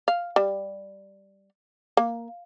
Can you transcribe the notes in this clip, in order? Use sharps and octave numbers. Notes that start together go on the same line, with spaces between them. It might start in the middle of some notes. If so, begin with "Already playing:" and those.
F5
G3
A#3